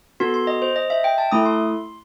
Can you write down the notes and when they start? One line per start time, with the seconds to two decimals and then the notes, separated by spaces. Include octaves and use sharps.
0.20 B3 F#4 A4 C6
0.34 C6
0.47 D#5
0.62 C5
0.76 D#5
0.90 E5
1.04 G5
1.18 A5
1.32 A3 E4 A4 D#6
1.45 C6